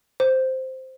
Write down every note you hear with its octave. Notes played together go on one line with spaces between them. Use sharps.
C5